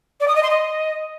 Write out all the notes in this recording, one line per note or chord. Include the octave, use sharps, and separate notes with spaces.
D5
D#6
D#5
C6
D#5